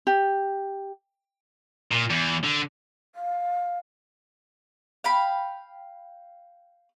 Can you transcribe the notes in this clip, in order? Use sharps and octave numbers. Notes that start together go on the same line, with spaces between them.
G4
A#2
E2
D3
F5
F5 G5 B5